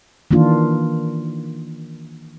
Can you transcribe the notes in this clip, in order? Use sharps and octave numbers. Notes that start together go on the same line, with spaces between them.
D#3 E3 A#3 D4 F4